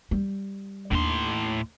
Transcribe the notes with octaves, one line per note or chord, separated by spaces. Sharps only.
G3
D#2 A2 D4 C6